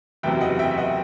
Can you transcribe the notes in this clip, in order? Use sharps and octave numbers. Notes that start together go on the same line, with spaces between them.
F#1 E2 C3 F#3 E5 G5
D#5 F#5
E5 G5
E5
D#5 F#5